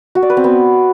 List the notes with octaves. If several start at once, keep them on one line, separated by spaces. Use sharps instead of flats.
F#4
D5
B4
C4
B3